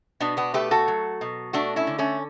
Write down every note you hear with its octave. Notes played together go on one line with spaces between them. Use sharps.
B2 B3 D4
B3 D4
A3 G4 B4
F#4 A4
F#3
B2
A3 D4 F#4
C#4 E4
D3
A3 C#4